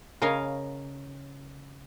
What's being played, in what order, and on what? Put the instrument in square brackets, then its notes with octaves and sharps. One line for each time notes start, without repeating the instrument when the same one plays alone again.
[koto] C#3 A#4 C#5 D#5 F5